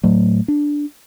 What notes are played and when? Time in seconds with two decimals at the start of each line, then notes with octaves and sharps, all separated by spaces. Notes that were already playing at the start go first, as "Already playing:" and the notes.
0.03 A2 F#3 A3
0.48 D4